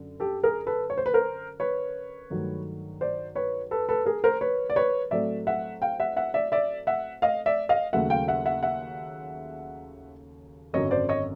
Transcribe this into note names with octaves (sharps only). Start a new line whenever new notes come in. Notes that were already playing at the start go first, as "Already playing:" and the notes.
Already playing: F#2 D3
G4 A4
G#4 A#4
A4 B4
C#5
C5
B4
A#4 C5
B4 C#5
G2 D#3 F#3 A3
C5 D5
B4 C#5
A4 B4
A4 B4
G#4 A#4
A#4 C5
B4 C#5
D5
B4 C#5
A2 F#3 A3 C4 D5 E5
E5 F#5
F5 G5
E5 F#5
E5 F#5
D5 E5
D5 E5
E5 F#5
D#5 F5
D5 E5
D#5 F5
D#2 C#3 F#3 A3 E5 F#5
F5 G5
E5 F#5
E5 F#5
E5 F#5
G#1 F#2 D3 F#3 C#5 D#5
C5 D5
C#5 D#5